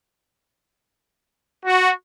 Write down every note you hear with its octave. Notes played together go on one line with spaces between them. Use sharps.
F#4